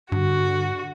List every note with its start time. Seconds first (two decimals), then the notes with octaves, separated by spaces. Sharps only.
0.12 G2 D3 F#4